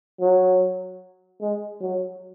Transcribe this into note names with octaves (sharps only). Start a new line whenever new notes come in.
F#3
G#3
F#3